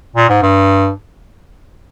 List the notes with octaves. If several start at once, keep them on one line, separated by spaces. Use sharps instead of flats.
A#2
G#2
G2